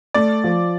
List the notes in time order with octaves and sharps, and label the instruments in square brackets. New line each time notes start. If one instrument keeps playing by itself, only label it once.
[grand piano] A3 [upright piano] D5
[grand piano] F3